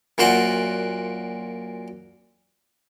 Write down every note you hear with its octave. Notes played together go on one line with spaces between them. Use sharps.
F#2 A#2 F#4 C5 F#5